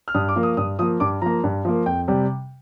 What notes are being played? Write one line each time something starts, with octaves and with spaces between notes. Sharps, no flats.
F6
G2 D#6
D6
F3 A#3
D#6
G2 D#6
F3 A#3 D#6
G2 D6
F3 A#3 A#5
G2
F3 A#3
F2 G5
C3 G3